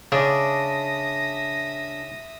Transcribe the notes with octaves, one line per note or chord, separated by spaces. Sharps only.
C#3 D4 E5 D#6 A#6